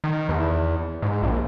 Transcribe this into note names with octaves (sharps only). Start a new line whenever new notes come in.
D#3
E2
G#2
A#1